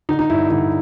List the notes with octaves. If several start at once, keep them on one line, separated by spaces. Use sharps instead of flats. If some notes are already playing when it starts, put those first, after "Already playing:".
D3 D#4
D#4
G2 E4
D3 E4